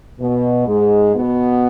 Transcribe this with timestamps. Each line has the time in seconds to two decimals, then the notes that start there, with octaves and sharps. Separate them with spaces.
0.20 B2
0.67 G#2 G#3
1.14 B2 B3